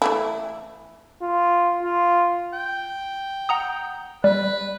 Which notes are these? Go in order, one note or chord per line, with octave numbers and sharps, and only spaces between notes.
E3 A3 E4
F4
F4
G5
F#5 A#5 D#6
G3 B4